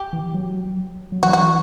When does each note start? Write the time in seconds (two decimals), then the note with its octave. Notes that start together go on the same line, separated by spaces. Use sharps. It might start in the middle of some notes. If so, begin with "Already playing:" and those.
Already playing: G4
0.13 E3
0.34 F#3
1.12 F#3
1.23 E3 F#4
1.33 F#4